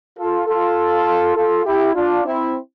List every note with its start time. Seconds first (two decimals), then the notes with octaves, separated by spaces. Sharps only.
0.17 F4 A4
0.47 F4 A4
1.35 F4 A4
1.65 E4 G4
1.94 D4 F4
2.25 C4 E4